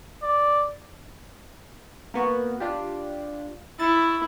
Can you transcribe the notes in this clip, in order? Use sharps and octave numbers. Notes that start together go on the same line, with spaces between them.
D5
A#3 B3 F#4
D4 F4 G4
E4 C#6 A6